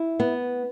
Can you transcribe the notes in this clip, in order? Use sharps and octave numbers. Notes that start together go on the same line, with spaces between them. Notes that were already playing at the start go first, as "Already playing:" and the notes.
Already playing: E4
B3